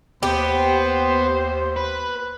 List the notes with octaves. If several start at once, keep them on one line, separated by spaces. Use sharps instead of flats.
D#2 B3 G4 C5
B4